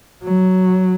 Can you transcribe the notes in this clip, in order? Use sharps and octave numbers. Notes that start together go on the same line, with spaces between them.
F#3